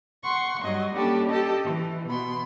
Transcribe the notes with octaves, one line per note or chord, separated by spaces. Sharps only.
F#5 C6 C#6
G2 F#3 D#5
G3 A#3 C#4 D4 G4 A4
G4 A4 D#5
E3
B2 B5 C6